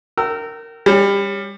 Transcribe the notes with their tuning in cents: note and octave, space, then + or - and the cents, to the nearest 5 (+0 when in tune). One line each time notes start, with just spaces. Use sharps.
A#4 -20 G5 -35 E6 +0
G3 +25 C#4 +0